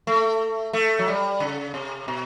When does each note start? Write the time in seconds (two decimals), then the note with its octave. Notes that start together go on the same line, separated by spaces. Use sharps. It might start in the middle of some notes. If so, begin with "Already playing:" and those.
0.07 A3
0.73 A3
0.99 F#3
1.08 G3
1.40 C#3
1.74 C3
2.08 B2